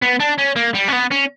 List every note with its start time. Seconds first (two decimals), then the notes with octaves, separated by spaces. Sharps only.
0.02 B3
0.20 D4
0.39 C#4
0.56 A#3
0.75 G3
0.89 C#4
0.93 B3
1.11 C#4